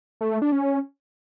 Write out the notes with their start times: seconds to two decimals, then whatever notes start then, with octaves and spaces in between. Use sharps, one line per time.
0.21 A3
0.31 A3
0.42 D4
0.52 C#4